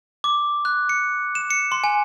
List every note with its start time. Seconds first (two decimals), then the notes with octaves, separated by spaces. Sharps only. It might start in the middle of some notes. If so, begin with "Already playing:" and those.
0.24 D6
0.65 F#6
0.89 C#7
1.35 E7
1.50 C#7
1.72 C6
1.84 G#5